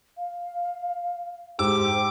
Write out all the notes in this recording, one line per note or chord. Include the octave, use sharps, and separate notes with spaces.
F5
G#2 G4 C5 D6 E6